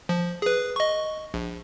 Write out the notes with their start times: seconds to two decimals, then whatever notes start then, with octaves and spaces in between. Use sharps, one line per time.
0.09 F3
0.42 G#4 B4
0.76 D#5 C#6
1.34 A#1